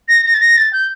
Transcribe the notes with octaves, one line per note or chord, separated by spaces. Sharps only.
A#6
A#6
A6
A#6
A6
G6